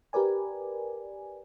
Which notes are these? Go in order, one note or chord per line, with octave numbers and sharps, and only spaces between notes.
G4 A#4 B4 D5 G#5